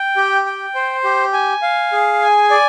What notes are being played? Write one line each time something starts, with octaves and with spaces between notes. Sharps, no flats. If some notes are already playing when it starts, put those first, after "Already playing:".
Already playing: G5
G4
G5
C5
G4
G#5
F5
G#4
G#5
D5